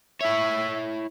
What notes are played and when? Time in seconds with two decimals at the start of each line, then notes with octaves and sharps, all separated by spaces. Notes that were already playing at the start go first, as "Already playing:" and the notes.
0.21 E4 C#5 E5